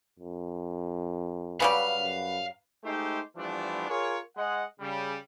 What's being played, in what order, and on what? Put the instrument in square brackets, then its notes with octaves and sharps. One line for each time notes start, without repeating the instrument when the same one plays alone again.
[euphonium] F2
[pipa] C#3 F#3 G3 [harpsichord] B4 [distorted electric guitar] F5
[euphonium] F#2
[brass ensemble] G#3 A3 D#4 G4 C5
E3 F3 G3 A3 B3 D4
F4 G#4 A#4 C#5
G#3 D#5 F#5
C#3 G3